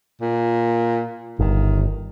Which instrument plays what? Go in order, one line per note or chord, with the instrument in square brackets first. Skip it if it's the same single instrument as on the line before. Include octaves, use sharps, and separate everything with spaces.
[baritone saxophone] A#2
[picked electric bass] G1 [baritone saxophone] D#3